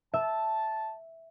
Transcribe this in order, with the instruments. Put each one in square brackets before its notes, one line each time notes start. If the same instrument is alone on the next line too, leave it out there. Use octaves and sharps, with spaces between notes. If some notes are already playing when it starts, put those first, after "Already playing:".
[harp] E5 [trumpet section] A5